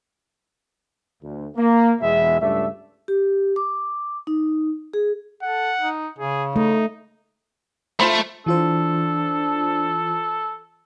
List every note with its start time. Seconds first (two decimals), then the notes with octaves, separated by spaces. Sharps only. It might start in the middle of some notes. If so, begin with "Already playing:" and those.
1.22 D2
1.56 A#3
2.01 E2 B2 G#3 E5
2.40 C#2 G2 A3 D5 E5
3.08 G4
3.56 D6
4.27 D#4
4.94 G#4
5.43 A4 F#5
5.81 D#4
6.18 C#3 G#4
6.56 A3 D#4
8.00 A3 F4 C5 B5
8.46 E3 D4 F4 A4 C5